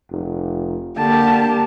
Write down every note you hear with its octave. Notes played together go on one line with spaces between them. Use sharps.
F1
D3 A#3 G4 A5